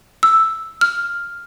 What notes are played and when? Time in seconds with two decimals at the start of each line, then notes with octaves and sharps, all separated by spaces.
0.23 E6
0.81 F6